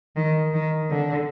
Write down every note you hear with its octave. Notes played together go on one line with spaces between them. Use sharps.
D#3
D#3
D3